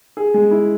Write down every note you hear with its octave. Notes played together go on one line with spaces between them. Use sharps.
G#4
G#3
E4